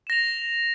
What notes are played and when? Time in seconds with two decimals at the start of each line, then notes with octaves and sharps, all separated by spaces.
0.07 E7
0.10 A#6
0.12 F7